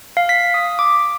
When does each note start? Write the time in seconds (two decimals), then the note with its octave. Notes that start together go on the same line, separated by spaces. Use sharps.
0.17 F5
0.29 B6
0.54 D#6
0.79 D6